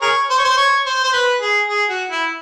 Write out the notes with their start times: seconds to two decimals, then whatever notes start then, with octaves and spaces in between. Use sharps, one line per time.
0.02 G#4 A#4 C#5
0.30 C5
0.38 C#5
0.44 C5
0.57 C#5
0.86 C5
1.04 C5
1.13 B4
1.41 G#4
1.68 G#4
1.90 F#4
2.10 E4